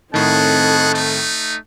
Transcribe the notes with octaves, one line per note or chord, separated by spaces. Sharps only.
A2 D#3 C4 G#4 A4 D#5 F#5 A5
A3 D#4